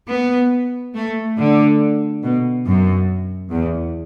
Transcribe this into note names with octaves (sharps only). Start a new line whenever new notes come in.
B3
A3
D3
B2
F#2
E2